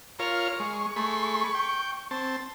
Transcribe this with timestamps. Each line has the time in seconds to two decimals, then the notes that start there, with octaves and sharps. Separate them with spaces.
0.19 F4 A#4 C#5 F6
0.60 G#3 C#6
0.96 A3 G#4 B5
1.55 G5
2.11 C4 A5